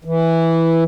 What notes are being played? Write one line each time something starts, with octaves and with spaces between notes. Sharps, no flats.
E3